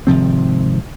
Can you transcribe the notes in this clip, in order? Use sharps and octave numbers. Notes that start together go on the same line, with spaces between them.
G#1 C3 F3 C4